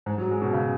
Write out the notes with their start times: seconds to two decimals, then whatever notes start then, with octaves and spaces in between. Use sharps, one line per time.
0.06 G#2
0.18 F#3
0.31 G#3
0.42 B2
0.53 C#3